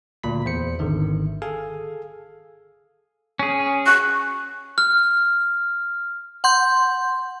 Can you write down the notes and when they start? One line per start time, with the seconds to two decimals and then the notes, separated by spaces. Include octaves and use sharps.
0.23 D2 A#2 B5 B6
0.45 E2 C5 C#7
0.79 G#1 D3 D#3 E5
1.42 G#4 A4 F5 G#5
3.39 C#4 G#4
3.86 C#6 F#6
4.78 F6
6.44 F#5 C6 G6